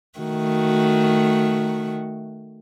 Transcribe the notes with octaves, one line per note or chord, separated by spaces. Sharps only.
D#3 A3 F#4